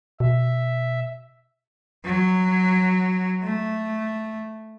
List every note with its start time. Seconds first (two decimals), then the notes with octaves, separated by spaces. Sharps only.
0.20 B2 E5
2.05 F#3
3.43 A3